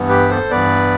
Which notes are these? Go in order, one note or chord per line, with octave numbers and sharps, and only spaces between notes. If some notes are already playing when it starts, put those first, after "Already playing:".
Already playing: G2 E3 B3
G4 B4
A4 C5
G2 E3 B3 B4 D5